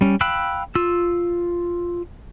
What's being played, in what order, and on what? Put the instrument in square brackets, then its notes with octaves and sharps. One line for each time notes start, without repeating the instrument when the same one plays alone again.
[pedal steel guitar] G3 C#4
F5 G5 B5 E6 F#6
F4 E6